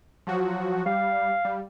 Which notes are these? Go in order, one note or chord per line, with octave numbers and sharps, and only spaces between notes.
F3 F#3 F#4
G3 F5
G3